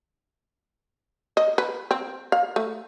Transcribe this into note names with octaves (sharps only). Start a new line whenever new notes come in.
D#5
B4
C4
F5
A3